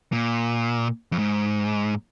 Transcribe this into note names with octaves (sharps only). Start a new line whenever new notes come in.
A#2
F2
G#2